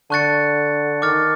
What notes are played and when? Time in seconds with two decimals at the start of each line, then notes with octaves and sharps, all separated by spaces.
0.10 D3 A5 C#6 F#6 A6 C#7
1.02 D#3 D6 F6 A6